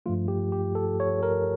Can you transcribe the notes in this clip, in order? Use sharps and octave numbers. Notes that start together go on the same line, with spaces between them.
G2 F3 A3 F4
G4
G4
A4
C#5
A#4